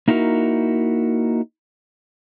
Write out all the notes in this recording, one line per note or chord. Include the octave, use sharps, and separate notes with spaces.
A#3 D#4 E4 F#4 A#4